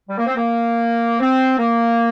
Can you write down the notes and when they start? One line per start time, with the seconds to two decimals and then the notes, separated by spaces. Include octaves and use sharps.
0.08 G3
0.18 A#3
0.26 C4
0.36 A#3
1.20 C4
1.57 A#3